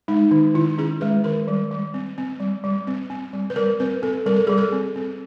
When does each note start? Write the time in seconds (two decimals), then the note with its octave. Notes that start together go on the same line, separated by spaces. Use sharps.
0.08 G#3 D#4
0.31 D#3
0.54 D#3 E4
0.78 C#4 G#4
1.01 G#3 B4
1.24 D#3 A#4
1.48 G3
1.71 G3
1.94 C4
2.18 C4
2.40 G3
2.64 G3
2.87 C4
3.10 C4
3.33 G3
3.50 B4
3.56 G3 A#4
3.80 C4 B4
4.03 C4 A4
4.26 G3 A#4
4.36 A4
4.47 G3 G#4
4.58 A4
4.72 C4
4.96 C4